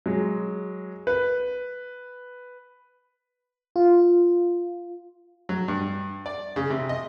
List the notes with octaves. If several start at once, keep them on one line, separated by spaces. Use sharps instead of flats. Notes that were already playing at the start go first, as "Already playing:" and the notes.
F#3 G#3
B4
F4
F#3
G2
D5
C#3
C3
D#5